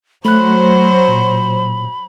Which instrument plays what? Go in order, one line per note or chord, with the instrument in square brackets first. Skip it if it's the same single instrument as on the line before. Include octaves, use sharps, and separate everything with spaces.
[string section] F#3 C5 [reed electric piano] A3 F#6 [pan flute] B5
[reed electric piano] A#2